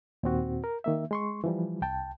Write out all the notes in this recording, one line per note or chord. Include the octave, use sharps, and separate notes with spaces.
D#2 A#2 C4 F#4
A#4
D#3 A#3 E5
G#3 C6 C#6
E3 F3 G3
C2 G5 A5